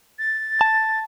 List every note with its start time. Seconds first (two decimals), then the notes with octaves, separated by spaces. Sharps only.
0.19 A6
0.61 A5